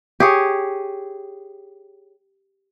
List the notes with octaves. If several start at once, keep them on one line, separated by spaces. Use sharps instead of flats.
G4 G#4 C#5